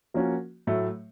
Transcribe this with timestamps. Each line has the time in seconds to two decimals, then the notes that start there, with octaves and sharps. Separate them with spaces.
0.14 F3 A#3 C#4 F#4
0.67 A2 F#3 A3